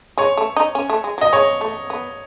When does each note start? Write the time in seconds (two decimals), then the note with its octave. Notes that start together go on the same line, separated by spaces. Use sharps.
0.18 G#3 C#5
0.37 A3
0.56 D#4
0.75 C#4
0.90 A3
1.04 G#3
1.18 F#3
1.21 D#5
1.33 G#3 C#5
1.61 A3
1.90 B3